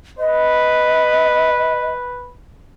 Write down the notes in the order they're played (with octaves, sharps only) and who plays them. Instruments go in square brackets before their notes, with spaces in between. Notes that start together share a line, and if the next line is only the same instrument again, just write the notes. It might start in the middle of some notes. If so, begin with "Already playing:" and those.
[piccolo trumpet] B4 [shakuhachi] D#5